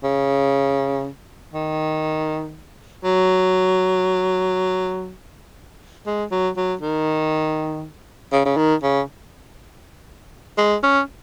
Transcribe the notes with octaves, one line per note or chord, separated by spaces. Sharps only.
C#3
D#3
F#3
G#3
F#3
F#3
D#3
C#3
C#3
D#3
C#3
G#3
C#4